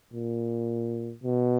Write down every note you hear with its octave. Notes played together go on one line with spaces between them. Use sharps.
A#2
B2